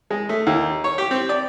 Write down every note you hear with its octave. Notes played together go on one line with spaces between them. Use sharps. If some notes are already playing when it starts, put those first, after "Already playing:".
G#3
A3
D#2
C#5
G4
C4
D5